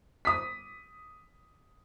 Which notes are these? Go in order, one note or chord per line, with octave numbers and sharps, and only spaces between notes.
D#6 B6